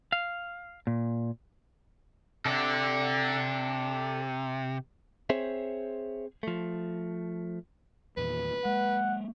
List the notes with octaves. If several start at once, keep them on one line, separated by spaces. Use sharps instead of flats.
F5
A#2
C3 A4 D5
C4 G#4 C5 C#5 E5
F3 A3
E2 A#2 D#3 B4
G#3 A#3 F#5